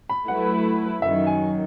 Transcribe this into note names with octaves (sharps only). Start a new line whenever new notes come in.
B5
F#3 A3 E4 B4 F#5
F#2 D#3 F#3 E5
G#5